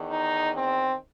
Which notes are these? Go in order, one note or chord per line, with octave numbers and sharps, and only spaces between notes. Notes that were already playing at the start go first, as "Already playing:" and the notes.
Already playing: E2 D#3
D#4
C4